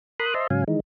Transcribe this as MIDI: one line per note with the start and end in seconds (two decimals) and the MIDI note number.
0.20 0.34 70
0.20 0.34 83
0.20 0.34 84
0.20 0.34 87
0.20 0.34 90
0.34 0.47 72
0.34 0.47 75
0.34 0.47 76
0.34 0.47 81
0.34 0.47 82
0.34 0.47 84
0.50 0.64 44
0.50 0.64 49
0.50 0.64 54
0.50 0.64 61
0.50 0.64 77
0.50 0.64 80
0.68 0.80 51
0.68 0.80 52
0.68 0.80 56
0.68 0.80 63